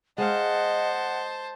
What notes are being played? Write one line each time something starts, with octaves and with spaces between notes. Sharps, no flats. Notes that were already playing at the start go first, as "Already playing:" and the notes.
G#3 C5 D#5 F5 F#5 A5